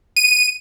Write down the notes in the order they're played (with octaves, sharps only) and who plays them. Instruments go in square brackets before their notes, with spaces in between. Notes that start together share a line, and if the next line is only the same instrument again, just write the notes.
[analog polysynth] D#7